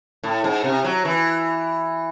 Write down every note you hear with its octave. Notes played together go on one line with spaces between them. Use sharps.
A2
G#2
C3
F#3
E3